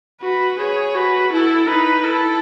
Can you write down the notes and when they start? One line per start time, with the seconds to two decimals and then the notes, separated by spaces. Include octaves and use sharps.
0.22 F#4 B4
0.59 G#4 C#5
0.95 F#4 B4
1.32 E4 A4
1.67 D#4 B4
2.04 E4 A4